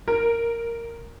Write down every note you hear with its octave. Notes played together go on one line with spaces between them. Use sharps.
A#4